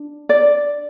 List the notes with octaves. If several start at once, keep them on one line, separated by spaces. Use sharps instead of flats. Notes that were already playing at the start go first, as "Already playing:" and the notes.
Already playing: D4
D5